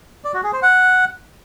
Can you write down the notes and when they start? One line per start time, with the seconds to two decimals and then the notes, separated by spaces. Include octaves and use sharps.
0.24 D5
0.34 F#4
0.43 G#4
0.53 C5
0.62 F#5